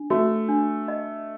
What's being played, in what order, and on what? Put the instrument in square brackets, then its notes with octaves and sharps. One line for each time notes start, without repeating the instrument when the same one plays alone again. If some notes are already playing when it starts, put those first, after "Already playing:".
Already playing: [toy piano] D4
[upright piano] A3 [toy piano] F#4
[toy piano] D4
D#5